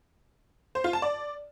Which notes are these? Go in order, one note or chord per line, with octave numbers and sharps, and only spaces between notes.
C5
F4
A5
D5